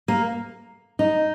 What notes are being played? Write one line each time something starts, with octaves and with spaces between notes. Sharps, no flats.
A#3
D#4